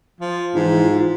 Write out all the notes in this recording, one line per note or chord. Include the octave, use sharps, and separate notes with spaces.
F3
G#2 E3
F4